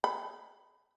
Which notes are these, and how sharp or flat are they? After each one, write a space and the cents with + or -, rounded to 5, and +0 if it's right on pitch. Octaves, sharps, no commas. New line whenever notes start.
B5 +15